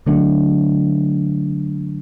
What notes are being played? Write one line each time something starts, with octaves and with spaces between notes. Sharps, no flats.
D3 F#3 A3 D4